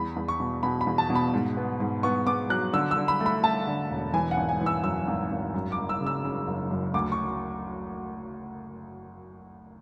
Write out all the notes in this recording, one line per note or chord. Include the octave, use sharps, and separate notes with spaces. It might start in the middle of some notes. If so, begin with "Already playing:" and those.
Already playing: E2 B5
E2
C#6
B2
B2 B5
B5
E2
A5
B2
B5
G#2
B3
G#2
B3 C#6
B3 D6
F#3 F#6
D3 E6
E6
D3
B5
A3
B5
A3 A5
D3
E1
E3 G#5
F#5
G#1
G#5
E3
E6
F#2 E6
G#1
G#1
F#2
D6
F#1
E6
C#3
E6
C#3
F#1
F#2
D2 D6
C#6